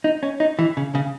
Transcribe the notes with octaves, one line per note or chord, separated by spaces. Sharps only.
D#4
C#4
D#4
E3
C#3
C#3